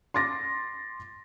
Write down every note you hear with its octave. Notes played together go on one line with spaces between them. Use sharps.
C6 D6 A6 A#6